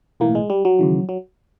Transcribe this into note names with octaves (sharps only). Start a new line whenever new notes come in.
B1 A2 E3 A#3
G#3
G3
F#3
D#2 C#3 E3
F#3